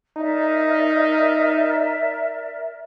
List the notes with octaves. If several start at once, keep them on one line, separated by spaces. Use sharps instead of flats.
D#4 A#4 D5 E5